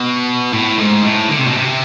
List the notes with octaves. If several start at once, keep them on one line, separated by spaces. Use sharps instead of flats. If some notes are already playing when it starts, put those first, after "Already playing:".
Already playing: B2
A2
G#2
A2
D3
C3
B2
C3